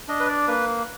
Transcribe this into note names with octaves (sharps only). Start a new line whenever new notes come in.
D4 D#5
B4
D5
A#3 B4